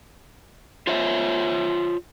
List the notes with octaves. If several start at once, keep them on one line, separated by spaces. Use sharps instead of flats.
F4 C5 C#5 E5